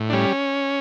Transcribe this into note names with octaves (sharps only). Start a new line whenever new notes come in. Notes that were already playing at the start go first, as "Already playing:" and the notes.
Already playing: A2
D4
G3 C#4